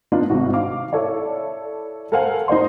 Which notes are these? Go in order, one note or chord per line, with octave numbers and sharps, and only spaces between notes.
B3 D4 D#4 F4
G#1 G#2 C3 F#4
F5 D6
E4 A4 C#5 D5
A4 A#4 C5 F5 F#5 G#5
D#4 C5 D5 C6